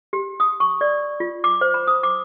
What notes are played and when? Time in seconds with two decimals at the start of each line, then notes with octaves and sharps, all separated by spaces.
0.13 G4
0.40 D#6
0.60 C#6
0.81 D5
1.20 F4
1.44 D6
1.61 C5
1.74 B5
1.87 D#6
2.03 D6